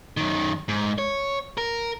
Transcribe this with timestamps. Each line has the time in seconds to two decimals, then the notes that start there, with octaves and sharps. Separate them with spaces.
0.17 F#2 D#3
0.68 G#2
0.98 C#5
1.58 A#4